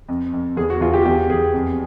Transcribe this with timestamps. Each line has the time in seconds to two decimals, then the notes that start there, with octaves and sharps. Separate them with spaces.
0.08 F2
0.33 F2
0.57 E2 G#4
0.70 F#4
0.81 E2 F4
0.94 G4
1.05 E2 G4
1.30 E2 G#4
1.54 F2